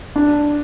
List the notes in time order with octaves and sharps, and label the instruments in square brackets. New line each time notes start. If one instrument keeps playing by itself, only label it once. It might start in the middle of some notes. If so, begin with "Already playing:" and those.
[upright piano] D4